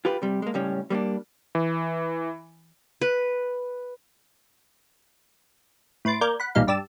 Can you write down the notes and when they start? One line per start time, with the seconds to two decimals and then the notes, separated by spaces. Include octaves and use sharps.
0.05 F4 G4 B4
0.22 C3 G3
0.42 G#3 A#3
0.54 C#2 A2 G3 C#4
0.90 G3 A#3 C4 D4
1.55 E3
3.01 B4
6.05 A2 B4 C6 A6 D7
6.21 A#3 A#4 D5 G6 G#6
6.40 F#5 B5
6.55 B1 E2 A#2 G3 D#4 F5
6.67 G2 G4 D5 A5 E6